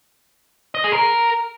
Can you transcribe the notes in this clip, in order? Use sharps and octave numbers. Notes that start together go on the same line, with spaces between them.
D#5
G#4
A#4